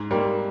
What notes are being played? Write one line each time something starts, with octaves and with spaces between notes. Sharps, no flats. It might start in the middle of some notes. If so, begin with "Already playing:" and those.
Already playing: G#2
G3 A#3